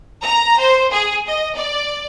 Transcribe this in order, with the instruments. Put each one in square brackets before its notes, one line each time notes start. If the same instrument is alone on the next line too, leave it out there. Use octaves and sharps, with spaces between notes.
[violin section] A#5
C5
G#4
D#5
D5